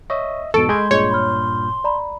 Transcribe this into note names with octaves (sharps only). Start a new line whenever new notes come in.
C#5 D#5 E5 C#6
E2 G#2 B2 A4 C#6 E6 D7
G#3 B5 C6 G6 G#6
G2 A#2 G#4 C#5 D#5 G6
B5 F6
D5 A#5 B5